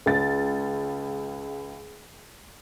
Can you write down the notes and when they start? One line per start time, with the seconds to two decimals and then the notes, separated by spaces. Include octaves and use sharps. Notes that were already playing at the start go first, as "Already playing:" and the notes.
0.06 C#2 A6